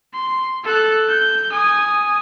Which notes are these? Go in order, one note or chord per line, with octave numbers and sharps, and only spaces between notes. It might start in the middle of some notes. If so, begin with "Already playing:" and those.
C6
A4 F#6
G6
G#5 D#6